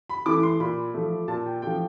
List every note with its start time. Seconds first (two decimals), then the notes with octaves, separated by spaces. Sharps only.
0.10 B5
0.26 E3 A3 D6
0.43 C6
0.60 A#2 B5
0.94 F3 A3
1.28 A#2 A5
1.46 G5
1.62 F3 A3 G5